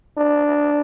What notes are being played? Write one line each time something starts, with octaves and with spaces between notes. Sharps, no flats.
D4